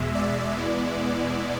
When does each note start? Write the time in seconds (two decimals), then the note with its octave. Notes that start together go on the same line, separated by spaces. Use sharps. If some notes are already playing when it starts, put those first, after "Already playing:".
Already playing: E2 B2 G#3 E5
0.15 D5
0.53 E2 B2 G#3 B3 E4